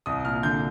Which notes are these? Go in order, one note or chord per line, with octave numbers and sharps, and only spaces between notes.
C2 D#6
A#2 F6
D3 G6